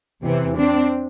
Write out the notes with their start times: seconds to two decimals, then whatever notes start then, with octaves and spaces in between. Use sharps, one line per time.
0.22 E2 C3 E3
0.57 C4 D4